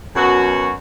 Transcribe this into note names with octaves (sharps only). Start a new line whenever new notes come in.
F#2 B2 F#4